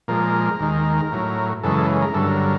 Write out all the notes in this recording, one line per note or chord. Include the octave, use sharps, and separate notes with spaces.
A#2 F3 G#3 A#4
D#2 D#3 G#3
A2 F#3
F#2 C#3 E3 G#3 A4
A#4
G2 D3 F#3 A4
A#4